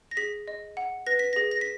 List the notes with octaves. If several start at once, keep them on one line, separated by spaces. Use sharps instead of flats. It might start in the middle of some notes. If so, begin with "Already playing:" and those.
A#6
G#4 B6
D#5
F#5
B4 A#6
B6
G#4 A#6
A#6
B6